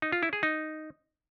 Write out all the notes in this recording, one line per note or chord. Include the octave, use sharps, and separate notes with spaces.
D#4
F4
E4
G#4
D#4